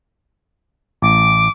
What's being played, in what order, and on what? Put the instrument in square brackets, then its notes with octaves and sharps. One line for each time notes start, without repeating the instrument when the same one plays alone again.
[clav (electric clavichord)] A1 [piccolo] D6